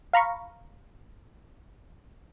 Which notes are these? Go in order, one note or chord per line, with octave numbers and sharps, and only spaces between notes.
F5 A#5 B5 C#6